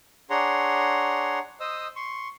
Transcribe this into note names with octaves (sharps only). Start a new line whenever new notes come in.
D4 G#4 C#5 F#5 A#5 C6
C5 D#5 D#6 E6
C6 C#6